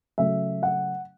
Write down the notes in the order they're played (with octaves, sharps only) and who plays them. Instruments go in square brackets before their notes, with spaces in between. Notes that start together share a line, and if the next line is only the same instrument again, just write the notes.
[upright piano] C#3 F#3 A3 E5
F#5